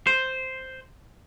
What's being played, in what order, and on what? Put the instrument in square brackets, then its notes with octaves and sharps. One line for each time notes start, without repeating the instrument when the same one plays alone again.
[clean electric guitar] C5